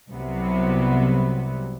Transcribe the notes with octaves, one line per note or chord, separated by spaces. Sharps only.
C2 C3 F#3 B3